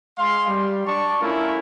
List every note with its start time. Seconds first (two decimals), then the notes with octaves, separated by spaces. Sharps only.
0.18 G#3 F5 C6
0.48 G3
0.86 D4 D5 A5 C#6
1.21 A3 C#4 E4 F4 A#4